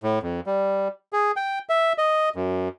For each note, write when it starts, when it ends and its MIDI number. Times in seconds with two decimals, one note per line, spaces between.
0.03 0.19 45
0.23 0.40 41
0.46 0.88 55
1.13 1.32 68
1.36 1.59 79
1.69 1.93 76
1.98 2.29 75
2.36 2.69 42